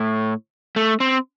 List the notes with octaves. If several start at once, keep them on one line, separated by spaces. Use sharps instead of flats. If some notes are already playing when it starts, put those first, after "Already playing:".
Already playing: A2
A3
C4